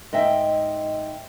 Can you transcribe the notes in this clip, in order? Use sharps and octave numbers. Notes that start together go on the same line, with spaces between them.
G#2 D#5 E5 G5